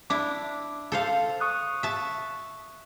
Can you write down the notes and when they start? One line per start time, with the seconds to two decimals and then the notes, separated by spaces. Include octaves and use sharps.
0.10 D4 E4 D6
0.92 A4 C5 F5
1.40 C#6 D#6 F#6
1.83 E5 A5